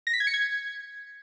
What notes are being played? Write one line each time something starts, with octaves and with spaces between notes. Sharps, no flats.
A#6
B6
G#6
C#7
G#6